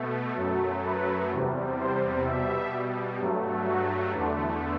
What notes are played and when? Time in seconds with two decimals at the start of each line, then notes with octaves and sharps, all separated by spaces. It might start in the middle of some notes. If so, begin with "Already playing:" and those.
Already playing: B2 A3
0.36 F#2 F#3 A3
0.83 B4
1.31 E2 C3 G3
1.78 C5
2.25 B2 G3 E5
3.19 G2 F#3 A3
3.66 F#4
4.13 E2 D3 A3 D4